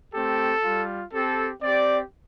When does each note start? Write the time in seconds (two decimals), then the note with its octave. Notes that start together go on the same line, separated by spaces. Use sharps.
0.14 A3 C4 G4 A4
0.64 G3 F4
1.13 C4 G4 A4
1.62 C4 G4 D5